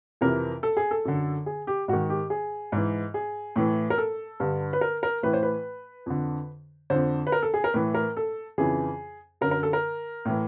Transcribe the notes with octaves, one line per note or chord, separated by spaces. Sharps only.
F2 C3 E3 A#4
A4
G#4
A4
F#2 D3
G#4
G4
G#2 D#3 F#4
G4
G#4
G#2 E3
G#4
A2 E3
A#4
A4
G2 D3
B4
A#4
A#4
A2 E3 B4
C5
B4
F2 D3
F2 D3 C5
B4
A#4
A4
G#4
A#4
A2 E3 B4
A#4
A4
F2 C#3 E3 G#4
F#2 D3 A#4
A#4
A4
A#4
A2 E3